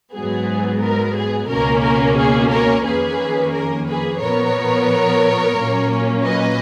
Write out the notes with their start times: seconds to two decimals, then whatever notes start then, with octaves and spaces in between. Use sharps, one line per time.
0.14 G#2 F#3 B3 G#4
0.82 A#4
1.16 G#4
1.49 C#2 B2 A#3 C#4 A#4
1.84 A#4
2.18 G#4
2.51 A#4 C#5
2.85 F2 D#3 A#3 C#4 G#4 B4
3.53 A#4
3.87 G#4 B4
4.21 A#2 F3 B3 A#4 C#5
5.57 A#2 F#3 A#3 C#4
6.25 B4 D#5